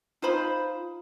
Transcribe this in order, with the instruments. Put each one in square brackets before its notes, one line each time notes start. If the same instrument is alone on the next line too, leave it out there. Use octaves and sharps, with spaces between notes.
[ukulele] D#4 F4 C5 B5